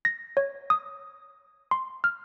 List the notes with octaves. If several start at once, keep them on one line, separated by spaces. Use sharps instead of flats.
A#6
C#5
D#6
C6
F6